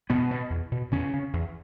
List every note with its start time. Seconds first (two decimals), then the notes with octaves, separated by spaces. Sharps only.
0.09 E2 B2 B3
0.30 B2
0.50 E2
0.72 B2
0.91 E2 C#3 C#4
1.13 C#3
1.33 E2